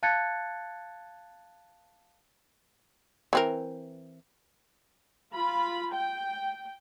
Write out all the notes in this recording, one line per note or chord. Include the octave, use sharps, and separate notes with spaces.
F5 A5 F#6 G#6 A6 C#7
E3 C4 A#4
F4 B5
G5